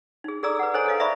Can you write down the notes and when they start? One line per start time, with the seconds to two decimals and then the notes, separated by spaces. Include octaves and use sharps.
0.24 D#4 G#4
0.43 G#4 A4 D5 A#5 D6 E6
0.59 B4 F#5
0.74 A4 C5 C#5 D#5 G#5 A#5
0.86 A4 B4 D#5 F5
1.00 D5 E5 A#5 B5 C#6